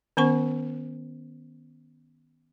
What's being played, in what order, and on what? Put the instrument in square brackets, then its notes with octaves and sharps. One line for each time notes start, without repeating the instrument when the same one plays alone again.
[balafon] D#3 B3 C#4 C5 C#6